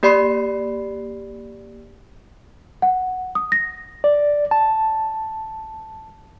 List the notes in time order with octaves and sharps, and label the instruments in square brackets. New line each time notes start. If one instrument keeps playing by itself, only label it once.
[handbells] A#3 G4 D5 B5 C6 C7
[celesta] F#5
D#6
A#6
[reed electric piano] D5
A5